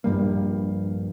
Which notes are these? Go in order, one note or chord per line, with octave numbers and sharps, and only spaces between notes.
A#1 G2 G3 A#3